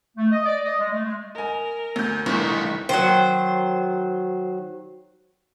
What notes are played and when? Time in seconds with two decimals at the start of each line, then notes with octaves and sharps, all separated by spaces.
0.17 A3
0.31 D#5
0.44 D5
0.64 D#5
0.78 G#3
0.92 A3
1.04 G#3
1.35 A#4 D#5 G#5
1.96 D2 G6
2.26 F1 G2 D#3 E3 C#6 B6
2.89 D#3 F#3 C5